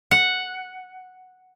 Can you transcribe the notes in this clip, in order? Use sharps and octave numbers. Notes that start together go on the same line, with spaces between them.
F#5